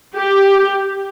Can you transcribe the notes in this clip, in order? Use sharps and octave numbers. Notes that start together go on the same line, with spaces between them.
G4